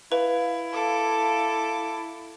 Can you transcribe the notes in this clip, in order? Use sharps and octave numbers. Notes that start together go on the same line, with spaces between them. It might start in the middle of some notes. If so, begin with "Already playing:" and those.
E4 B4 F5
A4 D6